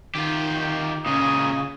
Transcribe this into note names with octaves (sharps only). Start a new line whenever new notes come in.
D#3 F4 G4
A#2 C#3 G#3 D#6